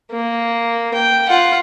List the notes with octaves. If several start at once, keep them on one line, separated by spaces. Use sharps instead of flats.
A#3
G5
F4 F#5